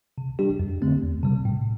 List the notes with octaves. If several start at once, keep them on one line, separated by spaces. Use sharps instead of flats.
C3
G3 D4 G4
F2
D3 A3 C4
E2
C3 G3
A2